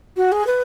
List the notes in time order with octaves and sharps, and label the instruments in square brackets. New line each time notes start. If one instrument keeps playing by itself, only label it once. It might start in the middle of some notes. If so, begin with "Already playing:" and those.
[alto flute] F#4
G#4
B4